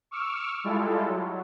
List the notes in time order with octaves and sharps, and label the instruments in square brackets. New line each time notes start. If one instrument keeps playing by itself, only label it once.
[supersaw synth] C#6 D6 E6 F6
G3 G#3 E4 F4 A4
F#3